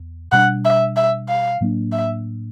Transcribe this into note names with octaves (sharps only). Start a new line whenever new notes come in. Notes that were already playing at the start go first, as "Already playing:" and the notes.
Already playing: E2
B2 G3 B3 D4 F#5
E5
E5
F5
A2 F#3 A#3 D4
E5